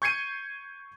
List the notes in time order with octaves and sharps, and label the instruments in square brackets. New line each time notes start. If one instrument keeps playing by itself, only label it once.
[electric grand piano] C#6 G6 G#6 C7 C#7 D#7